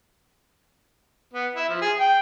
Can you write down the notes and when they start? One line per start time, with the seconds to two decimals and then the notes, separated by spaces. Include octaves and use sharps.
1.33 B3
1.56 E4
1.69 F3
1.81 G#4
1.99 G5